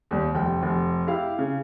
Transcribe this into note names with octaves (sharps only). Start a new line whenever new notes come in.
D#2 G3
F1 G5
F1
E4 G4 F5
C#3